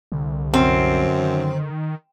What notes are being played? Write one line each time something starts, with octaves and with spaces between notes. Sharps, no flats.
C2 D3
F#2 C4
D#3